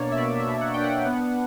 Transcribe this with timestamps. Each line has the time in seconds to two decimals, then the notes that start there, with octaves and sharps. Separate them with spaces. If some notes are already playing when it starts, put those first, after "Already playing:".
Already playing: B2 A#3 D4 C#5 D5
0.12 E5
0.18 B2 D5
0.40 E5
0.47 B2
0.61 F#5
0.74 D4 G5
0.84 F#5
1.06 B3